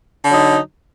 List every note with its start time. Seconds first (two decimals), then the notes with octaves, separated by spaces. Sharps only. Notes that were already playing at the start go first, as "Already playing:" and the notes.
0.24 D3
0.29 F#3
0.33 D#4